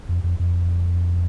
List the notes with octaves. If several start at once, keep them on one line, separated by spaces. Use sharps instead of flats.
F2
F2
F2